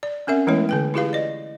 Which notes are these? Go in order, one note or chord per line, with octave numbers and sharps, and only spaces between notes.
D5
C4 C#4 A#4 E5 F#5
E3 G#3 A3 B3 E4 C#5
D3 B4 G5
E4 F4 G4 G#4 B4 F5
D5 D#5